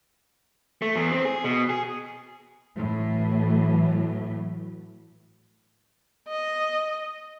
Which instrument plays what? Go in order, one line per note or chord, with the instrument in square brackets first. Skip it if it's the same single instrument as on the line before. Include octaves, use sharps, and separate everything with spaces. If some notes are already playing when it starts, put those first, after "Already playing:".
[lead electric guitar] A3
E2
C4
G#4
B2
G#4
[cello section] A2 [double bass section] E3 F#3
[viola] D#5